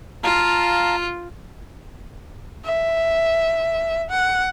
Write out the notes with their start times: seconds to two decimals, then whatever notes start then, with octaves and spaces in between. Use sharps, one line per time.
0.24 F4 F5 A5 A#5
2.65 E5
4.10 F#5